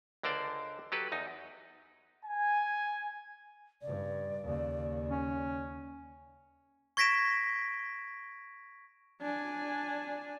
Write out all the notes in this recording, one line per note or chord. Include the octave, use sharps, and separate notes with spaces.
C#2 D3 A#4 C5 D5
F#3 G4 A4 B4
E2 D#4
G#5
G2 C#3 D5
D#2 C#3
C#4
C#6 G#6 A#6 B6 D7 E7
D4 G#5